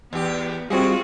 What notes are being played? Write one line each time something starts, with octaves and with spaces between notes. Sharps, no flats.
E2 B3 G4
G3 G#3 C4 F4 F#4 G#4